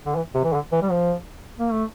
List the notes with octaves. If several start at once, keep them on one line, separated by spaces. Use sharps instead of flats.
D3
E3
C3
E3
D3
E3
G3
F3
A#3
A3